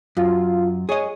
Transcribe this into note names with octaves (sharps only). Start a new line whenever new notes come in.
F#2 F4
G#4 C#5 D#5